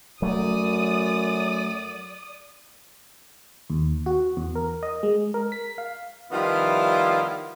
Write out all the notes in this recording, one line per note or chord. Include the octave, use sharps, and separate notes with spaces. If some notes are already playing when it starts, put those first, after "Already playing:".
F#2 F#3 A3 D5 D#6
D#2
F#4
E2
A#4
D#5
G#3
A#4
B6
F5
D#3 F3 G3 B3 E4 F4